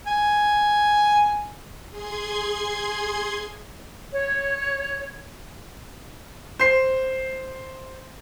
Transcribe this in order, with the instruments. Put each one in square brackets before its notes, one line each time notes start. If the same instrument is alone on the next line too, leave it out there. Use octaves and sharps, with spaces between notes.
[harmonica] G#5
[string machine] G#4 C6 G#6
[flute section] C#5
[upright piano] C5 C7